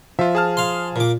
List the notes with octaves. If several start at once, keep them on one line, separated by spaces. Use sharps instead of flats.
F3 F4 E5
G#4 A5 F6
F5 C6
A#2 D6